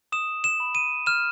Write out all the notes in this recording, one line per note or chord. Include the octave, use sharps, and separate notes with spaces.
D#6 E7
E7
B5
D#7
F6 E7